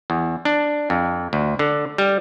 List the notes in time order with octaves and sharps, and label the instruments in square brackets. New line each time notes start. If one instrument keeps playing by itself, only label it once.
[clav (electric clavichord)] E2
D4
F2
D2
D3
G3